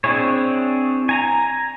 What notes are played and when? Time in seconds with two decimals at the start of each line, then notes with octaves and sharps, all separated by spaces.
0.04 C4 D4 E4 G#4 C#5
1.09 G#5 A#5